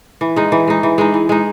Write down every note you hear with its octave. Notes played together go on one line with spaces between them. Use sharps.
E3
G#3 D#4
E3
G#3 D#4
E3
G#3 D#4
E3
G#3 D#4